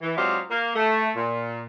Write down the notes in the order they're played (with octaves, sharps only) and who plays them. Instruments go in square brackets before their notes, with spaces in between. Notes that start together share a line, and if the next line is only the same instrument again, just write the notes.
[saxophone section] E3
F#3 G#3 C4 D4 F4 G4
A#3
A3
A#2